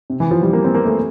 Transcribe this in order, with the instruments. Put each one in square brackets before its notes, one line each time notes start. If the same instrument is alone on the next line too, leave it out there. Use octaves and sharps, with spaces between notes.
[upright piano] C3
E3
F3
G3
A#3
C4
A#3
A3